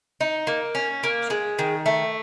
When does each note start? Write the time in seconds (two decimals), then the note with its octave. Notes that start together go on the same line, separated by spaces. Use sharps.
0.21 D#4
0.47 A#3
0.75 C#4
1.04 A#3
1.30 G#3
1.59 D#3
1.86 A3